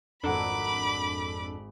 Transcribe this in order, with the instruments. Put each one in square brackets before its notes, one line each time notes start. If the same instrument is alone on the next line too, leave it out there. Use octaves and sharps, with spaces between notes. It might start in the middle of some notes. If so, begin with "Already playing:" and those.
[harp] G#1 F#5 A#5 [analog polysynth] F2 D4 A4 [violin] B5 D6